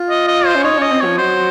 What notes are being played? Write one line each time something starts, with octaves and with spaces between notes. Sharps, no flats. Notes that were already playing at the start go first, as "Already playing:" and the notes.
Already playing: F4
D#5
D#5
C5
C#4
D#4 C#5
C#4 D#5
C4
F3 C#5
F#3 C5